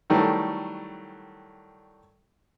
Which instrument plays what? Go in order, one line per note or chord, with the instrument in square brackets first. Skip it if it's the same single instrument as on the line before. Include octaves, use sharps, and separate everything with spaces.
[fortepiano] D#3 E3 F#3 G3 A3